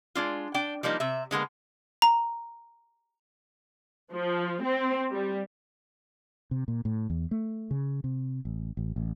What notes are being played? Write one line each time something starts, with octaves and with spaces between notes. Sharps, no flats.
G#3 D4 F4
D4 G5
F3 G3 A#3 D#4
C3 E5
D3 G#3 A#3 B3
A#5
F3
C4
G3
C3
A#2
A2
E2
A3
C#3
C3
A1
A1
A1